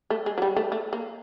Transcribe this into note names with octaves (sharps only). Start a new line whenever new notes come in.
A3
G#3
F#3
G3
A3
A3
A#3